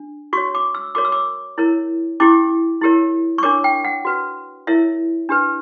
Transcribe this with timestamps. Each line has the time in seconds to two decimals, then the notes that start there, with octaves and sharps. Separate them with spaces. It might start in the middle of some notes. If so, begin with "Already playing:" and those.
Already playing: D4
0.33 F#4 C#5 C#6
0.55 D6
0.75 E6
0.95 F#4 A#4 C#5 D6
1.05 E6
1.12 D6
1.58 E4 A#4 C#5
2.20 C#4 E4 G4 D6
2.81 E4 G4 A#4 C#5
3.38 C#6
3.43 D4 A#4 C#5 D6
3.64 G5
3.84 F#5
4.05 F#4 B4
4.67 E4 A#4 C#5 E5
5.29 D4 G4 B4